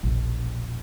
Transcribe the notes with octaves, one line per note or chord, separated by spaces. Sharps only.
E1 A#1